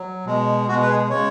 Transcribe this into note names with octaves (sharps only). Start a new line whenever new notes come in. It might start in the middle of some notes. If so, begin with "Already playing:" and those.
Already playing: F#3
B2 G#3
B2 G#3 F#4
B4
G#4
C#3 G#3 C#5